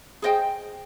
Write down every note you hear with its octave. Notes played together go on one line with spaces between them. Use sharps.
G#4 C5 D#5 G5